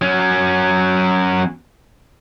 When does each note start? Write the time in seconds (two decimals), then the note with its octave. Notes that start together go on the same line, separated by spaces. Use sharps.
0.02 F#3 C#4